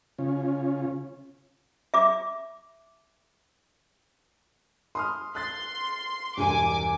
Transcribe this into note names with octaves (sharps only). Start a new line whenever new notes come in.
C#3 C#4 F4
E5 D6
C6 D#6 F6
C6 F#6 A6
E1 G2 G#5 D6